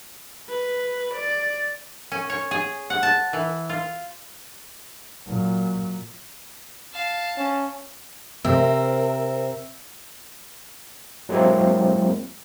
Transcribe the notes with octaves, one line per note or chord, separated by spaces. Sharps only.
B4
D5
C#4
C#5
G#4
F#5
A5
E3
F4
A#2 F#3
F5 A5
C#4
C3 C4 A#4 E5
F#3 G#3 A#3 C4 E4